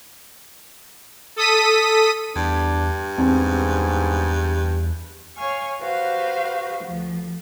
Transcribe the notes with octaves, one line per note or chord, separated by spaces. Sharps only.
A4 D#6 B6 D#7
E2 G2 D4
E2 G#2 C4
C#5 F5 G#5 C#6
F#4 G4 B4 C5 F5
D2 F3